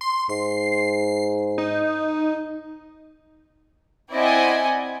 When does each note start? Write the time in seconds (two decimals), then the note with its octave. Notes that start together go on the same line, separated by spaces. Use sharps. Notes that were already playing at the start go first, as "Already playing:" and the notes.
0.01 C6
0.29 G#2 C7
1.58 D#4
4.13 C4 E4 D5 D#5 F#5 G#5